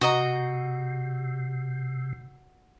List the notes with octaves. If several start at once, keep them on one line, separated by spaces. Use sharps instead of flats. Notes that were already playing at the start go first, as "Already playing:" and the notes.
C3 F#4 D#5 A#5